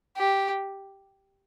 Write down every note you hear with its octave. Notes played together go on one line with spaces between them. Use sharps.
G4